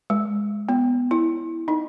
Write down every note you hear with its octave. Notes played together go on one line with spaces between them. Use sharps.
G#3
B3
E4
D#4